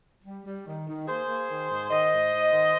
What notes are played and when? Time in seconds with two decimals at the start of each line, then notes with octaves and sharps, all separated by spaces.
0.25 G3
0.46 G3
0.66 D#3
0.88 D#3
1.07 A#3 G#4 C5
1.28 A#3
1.49 D#3
1.70 G#2
1.90 D#3 C5 D#5
2.11 G#2
2.32 G#2
2.52 D#3